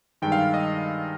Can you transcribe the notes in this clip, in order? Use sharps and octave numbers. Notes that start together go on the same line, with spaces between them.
G2 D#3 G#3 G5
F5
D#5